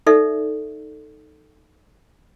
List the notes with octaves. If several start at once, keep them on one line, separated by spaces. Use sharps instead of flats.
D#4 A4 D5 E5